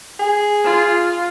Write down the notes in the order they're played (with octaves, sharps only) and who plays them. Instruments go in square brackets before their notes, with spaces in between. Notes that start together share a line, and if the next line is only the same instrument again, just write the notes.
[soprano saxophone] G#4
[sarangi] F4